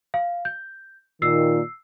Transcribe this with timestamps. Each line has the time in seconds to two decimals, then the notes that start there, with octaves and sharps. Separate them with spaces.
0.14 F5
0.45 G6
1.22 A#2 D#3 E6 C7